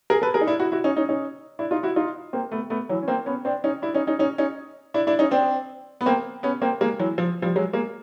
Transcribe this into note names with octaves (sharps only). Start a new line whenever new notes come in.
G#4 A#4
A4 B4
G#4 A#4
D#4
D4 E4
E4 F#4
E4 F#4
C#4 D#4
C#4 D#4
C#4 D#4
D4 E4
D#4 F4
E4 F#4
D#4 F4
A#3 C4
A3 B3
A3 B3
E3 F#3
C#4
A#3 C4
B3 C#4
C4 D4
C#4 D#4
D4 E4
C#4 D#4
C#4 D#4
C#4 D#4
C#4 D#4
D4 E4
D4 E4
C#4 D#4
C4 D4
B3
A#3 C4
B3 C#4
A#3 C4
G#3 A#3
E3 F#3
F3
F3 G3
F#3 G#3
G#3 A#3